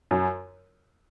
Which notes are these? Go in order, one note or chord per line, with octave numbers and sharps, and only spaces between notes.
F#2